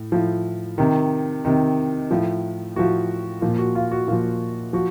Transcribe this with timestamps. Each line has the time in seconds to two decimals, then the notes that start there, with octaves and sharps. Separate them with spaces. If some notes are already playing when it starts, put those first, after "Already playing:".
Already playing: A2
0.12 A2 F3
0.78 C3 D#3
1.45 C3 D#3
2.11 A2 F3
2.76 A2 F3 F#4
3.41 A#2 F3 F4
3.58 F#4
3.75 F4
3.91 F#4
4.08 A#2 F3 F4
4.73 F3 F#4